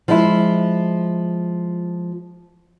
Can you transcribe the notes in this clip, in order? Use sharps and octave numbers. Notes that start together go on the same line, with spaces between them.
F3 G#3 E4